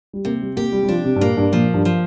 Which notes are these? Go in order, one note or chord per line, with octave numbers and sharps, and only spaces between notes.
G3
C3 A#3
G3
A#3 G4
G3
G3
F3 D4
C3
G2
A#2 A#3
G2
A#2 F3
G2
F3